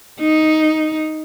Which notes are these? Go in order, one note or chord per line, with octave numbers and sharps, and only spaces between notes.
D#4